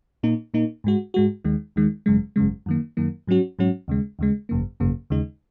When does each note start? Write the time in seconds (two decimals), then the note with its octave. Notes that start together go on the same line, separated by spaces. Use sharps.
0.23 A#2 A#3 D#4
0.54 A#2 A#3 D#4
0.84 G#2 G#3 F#4
1.14 G#2 G#3 F#4
1.44 D#2 D#3 G#3
1.76 D#2 D#3 G#3
2.06 G#1 F#2 C#3 G#3
2.36 G#1 F#2 C#3 G#3
2.66 F#2 D#3 A#3
2.97 F#2 D#3 A#3
3.27 G#2 F#3 C#4 F#4
3.59 G#2 F#3 C#4 F#4
3.88 D#2 C#3 G#3
4.19 D#2 C#3 G#3
4.49 G#1 F#2 C#3 A#3
4.80 G#1 F#2 C#3 A#3
5.10 D#2 C#3 G#3 D#4